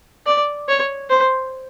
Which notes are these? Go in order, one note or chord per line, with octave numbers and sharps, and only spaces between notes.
D5
C#5
C5